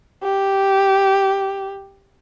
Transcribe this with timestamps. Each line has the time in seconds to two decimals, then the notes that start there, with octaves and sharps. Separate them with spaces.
0.23 G4